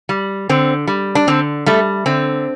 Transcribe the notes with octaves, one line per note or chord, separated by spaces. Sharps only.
G3
D3 C4
G3
D4
D3 C4
G3 A3
D3 C4